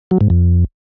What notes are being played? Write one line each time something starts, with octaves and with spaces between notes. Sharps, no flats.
F#3
G#2
F2